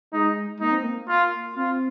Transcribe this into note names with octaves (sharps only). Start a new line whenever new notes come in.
G#3 D#4
A#3 D#4
C4
A#3
F4
C4 F4